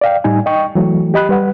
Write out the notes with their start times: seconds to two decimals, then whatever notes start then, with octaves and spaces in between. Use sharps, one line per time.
0.01 D5 F5 G5
0.24 A2 G3 D#4 G#5
0.46 D#5 G5 C#6
0.75 E3 F#3 A3
1.14 G4 D#5 B5 F#6
1.29 G3 B4 F#5